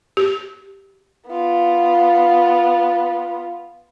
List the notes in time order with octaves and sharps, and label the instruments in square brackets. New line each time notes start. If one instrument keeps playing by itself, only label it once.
[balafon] G4
[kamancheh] B3 F4